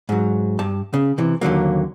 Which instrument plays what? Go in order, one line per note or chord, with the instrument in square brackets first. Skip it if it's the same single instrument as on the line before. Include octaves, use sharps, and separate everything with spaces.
[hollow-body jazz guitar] G#2 F#3
G2 A5
C#3
C3 E3
D#2 D3 F#3 A#3